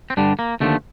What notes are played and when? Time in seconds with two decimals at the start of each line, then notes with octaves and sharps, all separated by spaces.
0.10 C4
0.17 G2 D3 G3 D4
0.39 A#3
0.60 D#2 D3 F3 A3